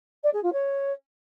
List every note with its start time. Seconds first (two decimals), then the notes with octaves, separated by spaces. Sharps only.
0.23 D5
0.33 G#4
0.43 F4
0.53 C#5